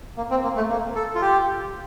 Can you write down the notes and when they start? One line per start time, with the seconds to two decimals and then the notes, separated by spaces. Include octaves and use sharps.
0.17 A#3
0.30 C4
0.43 A#3
0.56 A3
0.70 A#3
0.95 A4
1.15 F4
1.22 G4